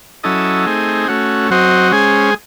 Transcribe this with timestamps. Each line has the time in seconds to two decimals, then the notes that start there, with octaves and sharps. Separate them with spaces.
0.23 F#3 C#4 E4 A4 D#5
0.66 A3 C4 D#4 G#4
1.08 A3 C#4 F#4
1.50 F#3 C4 F#4 C5 D#5
1.92 G#3 C#4 G#4 C5